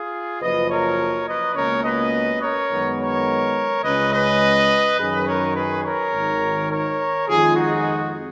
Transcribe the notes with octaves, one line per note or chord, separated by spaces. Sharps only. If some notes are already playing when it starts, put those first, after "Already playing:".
Already playing: F4 G#4
F#1 F#2 F3 B4 D#5
A#4 C#5
B4 D#5
C#2 B2 A#3 C#4 A#4 C#5
B4 D#5
A#4 C#5
F#2 D#3 G#3 B3
A#4 C#5
C#2 C#3 G#3 C#4 B4 D#5
B4 D#5
F#2 D#3 F#3 C#4 G#4 B4
A#4 C#5
G#4 B4
A#4 C#5
G#1 G#2 D#3
A#4 C#5
F2 D#3 G#3 F4 G#4
D#4 F#4